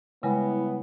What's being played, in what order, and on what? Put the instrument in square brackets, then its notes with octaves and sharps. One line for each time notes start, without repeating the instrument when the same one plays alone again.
[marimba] C#3 G3 G#3 [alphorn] B3 [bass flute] E4